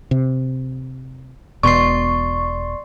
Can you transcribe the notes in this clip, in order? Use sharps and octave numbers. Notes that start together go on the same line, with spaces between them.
C3
E1 B2 D5 C6 C#6 C7